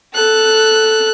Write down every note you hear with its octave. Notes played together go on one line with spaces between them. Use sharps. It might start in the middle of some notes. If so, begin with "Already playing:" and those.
A4 F#6